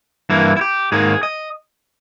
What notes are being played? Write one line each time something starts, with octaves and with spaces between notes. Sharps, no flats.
G2 E3 A#3 E4
E4
G4
G#2 D#3 A#3 G#4
D#5